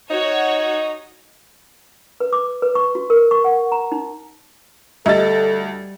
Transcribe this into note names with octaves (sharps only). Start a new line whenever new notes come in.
D#4 F#4 C#5
B4
D6
B4
C#6
F#4
A#4
C#6
F#5
A#5
D#4
D2 G3 G4 A4 D#5 E5 A6